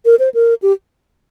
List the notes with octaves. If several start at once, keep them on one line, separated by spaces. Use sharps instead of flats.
A#4
C5
A#4
G4